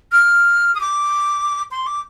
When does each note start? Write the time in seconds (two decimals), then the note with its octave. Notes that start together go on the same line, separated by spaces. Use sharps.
0.12 F6
0.75 D#6
0.80 D6
1.71 C6
1.87 D6